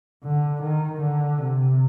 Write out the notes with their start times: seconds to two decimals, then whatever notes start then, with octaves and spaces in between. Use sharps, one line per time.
0.24 D3
0.62 D#3
1.00 D3
1.38 C3